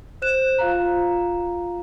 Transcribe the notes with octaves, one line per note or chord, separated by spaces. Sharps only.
C5 F#6 E7
F4 F5 A#5